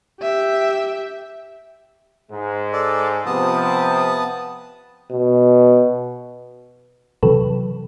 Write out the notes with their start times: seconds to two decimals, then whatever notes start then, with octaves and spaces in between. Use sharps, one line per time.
0.21 G4 E5
2.31 G#2 G#3
2.73 A4 D5
3.26 C3 F3 B3 A5 D#6
5.12 B2
7.23 C3 E3 F#3 A4 B4